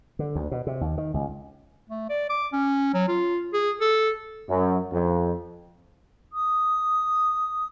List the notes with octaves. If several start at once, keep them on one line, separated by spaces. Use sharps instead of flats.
D3
D2
B2
C3
D#2
D#3
C#2
A3
D5
D6
C#4
F#3
F4
G#4
A4
F#2
F2
D#6